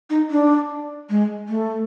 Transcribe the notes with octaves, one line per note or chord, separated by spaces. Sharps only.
D#4
D4
G#3
A3